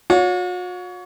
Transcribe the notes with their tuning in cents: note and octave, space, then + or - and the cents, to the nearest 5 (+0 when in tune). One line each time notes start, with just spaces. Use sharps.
F#4 -45 C#5 +25